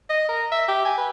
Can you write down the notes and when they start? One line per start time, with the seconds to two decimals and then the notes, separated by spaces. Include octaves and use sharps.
0.10 D#5
0.29 A#4
0.52 E5
0.68 G4
0.85 G#5
0.98 B4